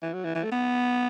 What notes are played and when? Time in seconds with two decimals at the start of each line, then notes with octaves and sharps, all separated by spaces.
0.02 E3
0.13 F#3
0.25 E3
0.35 E3
0.44 A3
0.52 B3